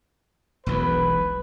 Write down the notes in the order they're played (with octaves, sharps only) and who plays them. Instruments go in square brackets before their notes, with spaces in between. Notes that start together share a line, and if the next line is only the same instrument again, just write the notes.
[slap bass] E1 B1 E2 [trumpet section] B4